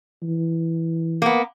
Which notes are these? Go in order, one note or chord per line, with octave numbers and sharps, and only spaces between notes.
E3
A#3 B3